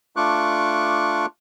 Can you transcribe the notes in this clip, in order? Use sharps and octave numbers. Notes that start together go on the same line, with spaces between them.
A3 D4 F4 C#6 D6 F#6